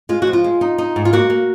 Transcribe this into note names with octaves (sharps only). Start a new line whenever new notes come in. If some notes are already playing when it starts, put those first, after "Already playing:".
G#3 F4
F#4
F3
F4
G#3
D#4
D#4
G#2
F4
A#3 F#4
A#3